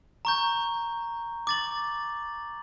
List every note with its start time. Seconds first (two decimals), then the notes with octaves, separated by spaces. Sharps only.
0.25 A#5 C#6 G6
1.47 D6 A6 F#7